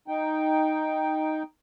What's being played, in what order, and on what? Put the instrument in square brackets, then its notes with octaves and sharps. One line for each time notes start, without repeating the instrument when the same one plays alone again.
[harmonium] D#4 G5